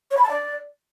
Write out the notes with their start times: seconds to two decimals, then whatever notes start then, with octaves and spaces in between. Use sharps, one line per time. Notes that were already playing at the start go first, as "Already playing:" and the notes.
0.11 C#5
0.17 B5
0.23 A5
0.29 D5